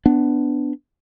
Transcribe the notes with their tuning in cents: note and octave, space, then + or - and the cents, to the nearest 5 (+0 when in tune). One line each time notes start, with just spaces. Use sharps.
B3 +10 D4 +0